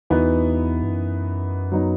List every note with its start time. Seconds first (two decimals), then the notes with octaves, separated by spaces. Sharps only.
0.10 E2 E3 B3 D#4 F#4 B4
0.83 G2
0.92 F#2
1.72 F#3 B3 D#4